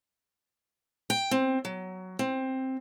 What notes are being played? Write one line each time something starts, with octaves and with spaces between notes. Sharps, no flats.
G5
C4
F#3
C4